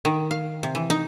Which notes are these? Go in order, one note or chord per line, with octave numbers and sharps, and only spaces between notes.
D#3
F5
C3
E3
D#4